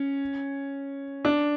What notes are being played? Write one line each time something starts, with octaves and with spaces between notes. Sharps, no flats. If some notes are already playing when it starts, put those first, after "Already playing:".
Already playing: C#4
D4